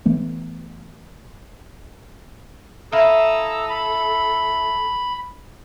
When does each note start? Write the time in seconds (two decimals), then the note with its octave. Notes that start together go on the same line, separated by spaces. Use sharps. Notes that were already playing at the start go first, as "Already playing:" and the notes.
0.06 E3 A3 B3
2.92 E4 A4 F5 A#5 D#6 E6
3.70 B5